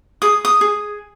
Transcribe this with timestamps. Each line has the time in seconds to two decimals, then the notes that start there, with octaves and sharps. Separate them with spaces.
0.22 G#4 D#6
0.45 D#6
0.61 G#4